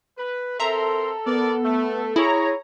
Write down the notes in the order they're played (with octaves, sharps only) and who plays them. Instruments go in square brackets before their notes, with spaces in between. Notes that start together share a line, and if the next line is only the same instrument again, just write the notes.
[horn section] B4
[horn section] C4 A#4 C6 [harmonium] A4 [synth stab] E5 A#5
[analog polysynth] B3 [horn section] A#4 D5
[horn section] A3
[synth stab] E4 [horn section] G#4 [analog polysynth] C#5 A#5